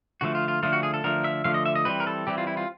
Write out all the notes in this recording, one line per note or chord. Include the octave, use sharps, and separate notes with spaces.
D3 F3 A3 F#4
F4
F4
D3 F3 A3 F4
F#4
G#4
A4
D3 F3 A3 A#4
E5
D3 F3 A3 F5
D#5
E5
D#5
E3 G3 C4 B4
A#4
A4
E3 G3 C4 G4
F4
E4
F4